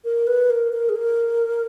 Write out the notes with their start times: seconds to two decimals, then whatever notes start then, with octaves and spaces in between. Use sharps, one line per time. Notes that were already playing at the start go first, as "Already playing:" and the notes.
0.05 A#4
0.27 B4
0.50 A#4
0.73 A#4
0.89 G#4
0.96 A#4